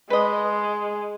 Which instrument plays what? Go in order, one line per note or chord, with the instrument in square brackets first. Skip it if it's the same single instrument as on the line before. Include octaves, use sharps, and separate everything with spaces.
[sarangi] G#3 [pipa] B4 D#5